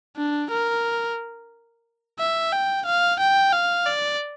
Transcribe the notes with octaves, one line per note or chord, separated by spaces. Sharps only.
D4
A#4
E5
G5
F5
G5
F5
D5